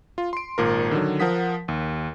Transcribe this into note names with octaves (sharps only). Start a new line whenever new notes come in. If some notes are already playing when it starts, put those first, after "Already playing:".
F4
C6 D7
G#1 A#2 A#4
D3 D#3 F#3
F3 A#4 F#5 D#6 B6
D#2